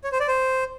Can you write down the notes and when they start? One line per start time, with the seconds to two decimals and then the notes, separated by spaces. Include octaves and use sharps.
0.04 C#5
0.12 C5
0.20 D5
0.28 C5